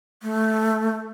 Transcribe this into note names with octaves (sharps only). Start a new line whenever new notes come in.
A3